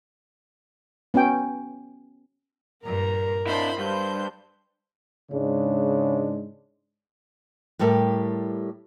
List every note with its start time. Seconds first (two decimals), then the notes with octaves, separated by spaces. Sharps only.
1.14 B3 C#4 F#4 G5
2.83 G2 A#2 A#4 A#5
3.46 D4 E4 C5 B5 G6
3.78 G2 B4 C5 G6
5.31 G#2 C#3 G#3 D4
7.79 A2 G3 G4 A4 A#4 E5